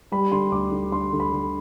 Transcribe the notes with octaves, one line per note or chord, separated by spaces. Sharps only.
G3 B5
D3 C6
D2 D6
D3
D3 C6
D3
B5
D3